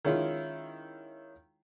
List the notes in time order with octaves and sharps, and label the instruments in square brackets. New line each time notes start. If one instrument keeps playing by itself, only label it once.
[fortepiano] D#3 G#3 C#4 E4 F4